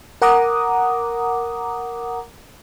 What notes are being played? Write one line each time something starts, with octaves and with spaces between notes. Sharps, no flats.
A#4 F#5 A#5 D6 D#6